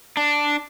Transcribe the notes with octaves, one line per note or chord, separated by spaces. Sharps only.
D4